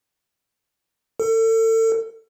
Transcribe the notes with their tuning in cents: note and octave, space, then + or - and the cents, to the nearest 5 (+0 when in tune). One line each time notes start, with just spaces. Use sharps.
A4 +35